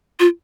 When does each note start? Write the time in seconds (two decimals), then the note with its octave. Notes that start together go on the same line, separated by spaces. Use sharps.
0.20 F4